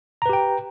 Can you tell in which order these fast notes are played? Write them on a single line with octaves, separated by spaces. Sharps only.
A#5 B4 G4 G5